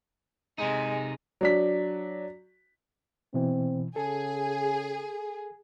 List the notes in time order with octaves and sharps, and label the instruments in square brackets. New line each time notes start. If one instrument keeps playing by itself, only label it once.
[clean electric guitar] C3 D#4 [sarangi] G#3
[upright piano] F#3 D4 B6
[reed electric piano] B2 E3 [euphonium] C4
[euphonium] C#3 [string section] G#4 [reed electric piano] A4